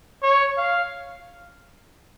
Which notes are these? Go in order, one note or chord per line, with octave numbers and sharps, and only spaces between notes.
C#5
F5